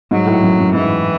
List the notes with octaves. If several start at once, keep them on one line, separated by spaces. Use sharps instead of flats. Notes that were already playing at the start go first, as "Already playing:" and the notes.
G#2 F#3
A2
F#2
F#2
G#2 E3